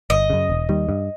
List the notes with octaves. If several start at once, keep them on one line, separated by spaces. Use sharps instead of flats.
G1 D#5
F#2 C#3
E1
D#2 D#3 G3
G2